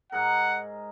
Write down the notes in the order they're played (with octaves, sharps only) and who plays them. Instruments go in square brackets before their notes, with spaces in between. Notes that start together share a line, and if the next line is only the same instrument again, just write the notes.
[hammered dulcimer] G#2 G#4 A#4 [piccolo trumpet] F#5